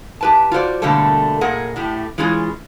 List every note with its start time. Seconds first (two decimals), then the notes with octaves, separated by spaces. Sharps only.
0.21 G4 B4 A5
0.51 F4 F#4 C5 D5
0.82 B2 D3 G3 A3 A#3 A4
1.41 A#2 G#4 A#4 F#5
1.76 A2 A3 G4
2.18 E3 G#3 C#4 F4 G#4